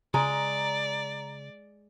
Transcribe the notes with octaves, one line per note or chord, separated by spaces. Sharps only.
C#3 G#3 D5 A#5